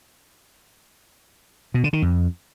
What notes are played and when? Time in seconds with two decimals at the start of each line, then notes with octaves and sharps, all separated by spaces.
1.74 B2
1.84 D3
1.93 D#3
2.02 F2